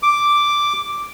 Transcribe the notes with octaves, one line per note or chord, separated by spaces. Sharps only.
D6